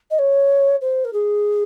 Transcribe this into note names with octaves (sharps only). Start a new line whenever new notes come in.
D#5
C#5
C5
A#4
G#4